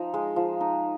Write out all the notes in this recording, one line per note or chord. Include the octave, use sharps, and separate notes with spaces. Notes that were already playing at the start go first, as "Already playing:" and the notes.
Already playing: F3 D#4 A#5
G#3
F3
D#4